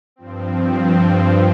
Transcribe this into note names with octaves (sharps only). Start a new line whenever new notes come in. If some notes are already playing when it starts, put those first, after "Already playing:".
G2 F3 C4